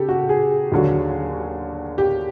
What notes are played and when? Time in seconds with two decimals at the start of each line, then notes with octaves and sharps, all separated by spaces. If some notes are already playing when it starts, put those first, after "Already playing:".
Already playing: C#3 G4 A4
0.09 F#4
0.29 G#4
0.72 D#2 D3 F#3
1.98 G4